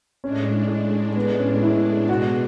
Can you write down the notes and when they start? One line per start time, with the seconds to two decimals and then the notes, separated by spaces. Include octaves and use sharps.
0.23 A2 G#3 C#4 D4
1.16 B3
1.39 C#4
1.63 E4
2.09 B2 G#3 D4 F#4